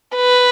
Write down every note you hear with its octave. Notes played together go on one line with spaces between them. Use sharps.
B4